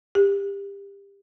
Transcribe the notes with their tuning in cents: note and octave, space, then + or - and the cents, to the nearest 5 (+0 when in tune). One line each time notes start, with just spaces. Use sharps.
G4 +25